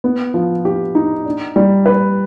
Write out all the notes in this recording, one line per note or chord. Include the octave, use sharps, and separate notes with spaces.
B3
F3
G4
D#4
D4
G3
B4